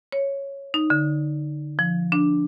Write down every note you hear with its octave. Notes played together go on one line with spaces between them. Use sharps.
C#5
D#4
D3
F3
D4